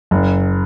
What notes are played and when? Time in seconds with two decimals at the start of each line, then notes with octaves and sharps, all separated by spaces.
0.11 F#1